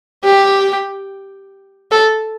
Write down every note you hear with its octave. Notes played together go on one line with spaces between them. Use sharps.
G4
A4